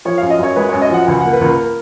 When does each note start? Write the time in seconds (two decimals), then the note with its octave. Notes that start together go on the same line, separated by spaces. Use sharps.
0.05 F3 C#5
0.18 F#2 F5
0.30 D#5
0.39 F#2 C#5
0.56 G#3 B4
0.69 F#2 C#5
0.82 D#5
0.90 F3 F#5
1.07 C#2 G#5
1.20 A#3 F#5
1.33 B4
1.41 C#2 A#4